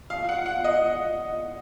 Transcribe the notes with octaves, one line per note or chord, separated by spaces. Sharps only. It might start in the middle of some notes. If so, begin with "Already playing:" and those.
F5
F#5
F#5
D#5